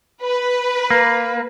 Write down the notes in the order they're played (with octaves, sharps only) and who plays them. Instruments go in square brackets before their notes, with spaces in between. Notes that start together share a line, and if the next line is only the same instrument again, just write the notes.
[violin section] B4
[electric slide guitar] A#3